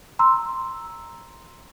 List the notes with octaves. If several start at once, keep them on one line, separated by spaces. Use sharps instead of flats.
A#5 C6 E6